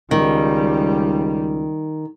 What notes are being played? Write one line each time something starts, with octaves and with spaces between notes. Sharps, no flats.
C#2 D#3 G3